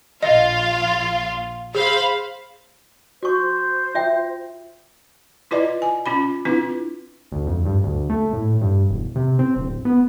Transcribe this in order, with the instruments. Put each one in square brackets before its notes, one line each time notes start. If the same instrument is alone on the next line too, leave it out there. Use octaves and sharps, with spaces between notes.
[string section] A#1 F4 F5 [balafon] D#5
[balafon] G#4 [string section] C5 F5 B5
[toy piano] F#4 C#6 [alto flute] C5
[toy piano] F4 E5 G5
[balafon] E4 F4 B4 D5 D#5
G#5
C#4 F4 B5
C4 D4 E4 F4 B4
[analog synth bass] D2
F2
G2
D2
A3
A2
G2
E1
C3
C4
D1
B3